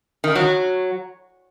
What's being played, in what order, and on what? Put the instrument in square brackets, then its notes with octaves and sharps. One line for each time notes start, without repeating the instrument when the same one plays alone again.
[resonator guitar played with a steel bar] D#3
F#3